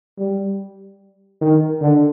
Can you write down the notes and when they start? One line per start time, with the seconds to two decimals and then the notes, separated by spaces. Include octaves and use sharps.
0.19 G3
1.41 D#3
1.81 D3